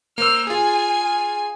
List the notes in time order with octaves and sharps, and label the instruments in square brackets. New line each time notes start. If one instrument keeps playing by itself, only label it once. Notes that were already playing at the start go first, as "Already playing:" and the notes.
[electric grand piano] A#3 C5 E6 [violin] F6
[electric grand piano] F4 G#4 [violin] G#5